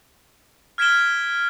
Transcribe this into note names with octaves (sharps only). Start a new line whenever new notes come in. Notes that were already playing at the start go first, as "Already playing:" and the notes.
F6 G#6 B6 D7 E7 G7